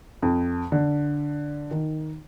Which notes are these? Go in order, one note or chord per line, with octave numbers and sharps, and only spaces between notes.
F2
D3
D#3